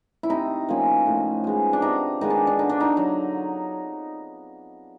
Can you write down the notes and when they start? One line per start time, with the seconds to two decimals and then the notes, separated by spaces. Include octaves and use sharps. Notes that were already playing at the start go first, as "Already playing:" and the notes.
0.23 E4
0.30 C3 D#4
0.69 F3 A#3 C#4
1.06 A2
1.44 F3 G#3 B3
1.73 D4
1.82 C3 D#4
2.21 D#3 G#3 B3 D#4
2.30 D4
2.47 D4
2.59 D3 D#4
2.69 D4
2.80 D#4
2.97 F#3